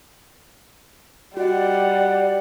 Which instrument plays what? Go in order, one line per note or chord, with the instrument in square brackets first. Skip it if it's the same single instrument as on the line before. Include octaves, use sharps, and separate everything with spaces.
[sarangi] G3 [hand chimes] F#4 D#5 [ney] D5 [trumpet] F#5